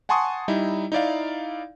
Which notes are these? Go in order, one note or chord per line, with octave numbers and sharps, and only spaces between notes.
F#5 G#5 A5 C6 C#6 D#6
G3 D#4 E4
D#4 E4 D5 F5